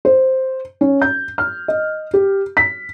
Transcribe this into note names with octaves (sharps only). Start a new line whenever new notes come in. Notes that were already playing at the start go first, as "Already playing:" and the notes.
C5
C#4
G6
F6
D#5
G4
B6